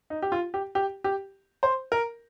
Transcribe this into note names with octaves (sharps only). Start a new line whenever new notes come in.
D#4
G4
F4
G4
G4
G4
C5
A#4